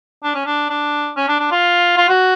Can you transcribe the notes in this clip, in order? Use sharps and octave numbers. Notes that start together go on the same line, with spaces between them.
D4
C#4
D4
D4
C#4
D4
D4
F4
F4
F#4